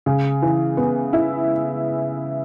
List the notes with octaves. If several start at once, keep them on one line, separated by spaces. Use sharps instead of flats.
C#3
E3
B3
E4